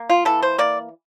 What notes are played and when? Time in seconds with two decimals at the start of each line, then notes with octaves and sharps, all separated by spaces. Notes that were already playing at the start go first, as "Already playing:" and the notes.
Already playing: A#3
0.10 F4
0.25 E3 A4
0.43 C5
0.58 A#3 D5